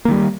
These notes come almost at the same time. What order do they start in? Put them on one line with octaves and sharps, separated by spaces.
A#3 D#3 G3